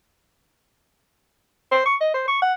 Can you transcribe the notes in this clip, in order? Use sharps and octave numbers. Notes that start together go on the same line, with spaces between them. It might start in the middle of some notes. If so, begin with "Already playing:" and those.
C5
C#6
D#5
C5
C#6
F#5